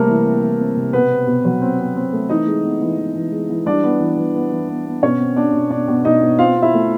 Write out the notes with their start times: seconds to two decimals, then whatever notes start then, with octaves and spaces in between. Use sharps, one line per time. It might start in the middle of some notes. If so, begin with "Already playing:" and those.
Already playing: C3 G3 A3 A#3 C4 A4 A#4
0.09 E3
0.26 C4
0.42 E3
0.60 C4
0.77 C3
0.93 B2 B3 B4
1.11 C4
1.27 B2
1.45 F#3
1.62 C4
1.79 C4
1.96 C4
2.13 A3
2.29 E3 D#4 D#5
2.47 G#3
2.64 B3
2.81 E3
2.98 E3
3.15 E3
3.32 G#3
3.50 E3
3.66 G3 D4 D5
3.84 B3
4.01 E3
4.17 E3
4.34 B3
4.52 E3
4.68 B3
4.86 B3
5.03 B2 C#4 C#5
5.20 C4
5.36 C4 D4 D5
5.53 B2
5.70 B2 D4 D5
5.88 B2
6.05 B2 D#4 D#5
6.22 B2
6.39 C4 F4 F5
6.56 C4
6.62 E4 E5
6.74 A3